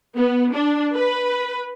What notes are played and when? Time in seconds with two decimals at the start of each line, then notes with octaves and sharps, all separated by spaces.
0.15 B3
0.52 D4
0.96 B4